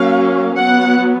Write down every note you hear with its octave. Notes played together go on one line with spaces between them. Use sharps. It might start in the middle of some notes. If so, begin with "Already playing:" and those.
Already playing: F#3 A#3 C#4 F5
F#3 B3 F#5